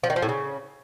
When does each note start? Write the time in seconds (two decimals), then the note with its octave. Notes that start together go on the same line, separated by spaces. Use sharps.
0.04 F3
0.10 D#3
0.16 F3
0.22 A2
0.29 C#3